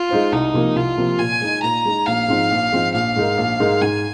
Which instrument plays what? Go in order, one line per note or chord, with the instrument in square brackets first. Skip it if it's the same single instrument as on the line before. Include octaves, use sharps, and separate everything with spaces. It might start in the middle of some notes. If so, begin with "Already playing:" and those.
Already playing: [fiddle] F4
[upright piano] G#3 D#4 C5 F5
[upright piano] C2 [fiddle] D#4
[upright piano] C3 F3 A#3
[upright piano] C2 [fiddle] F4
[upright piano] C3 F3 A#3
[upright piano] A#2 [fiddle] G#5
[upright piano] G#3 D#4
[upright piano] A#2 [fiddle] A#5
[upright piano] G#3 D#4
[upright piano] A#1 [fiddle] F5
[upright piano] G#2 F3 C4 D#4
A#1
G#2 F3 C4 D#4
[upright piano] A#1 [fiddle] F5
[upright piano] G#2 G#3 D#4 A#4
A#1
G#2 G#3 D#4 A#4
[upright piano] G#2 [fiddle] G#5